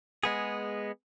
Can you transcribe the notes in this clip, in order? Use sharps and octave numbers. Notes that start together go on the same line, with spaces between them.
G#3 B3 G#4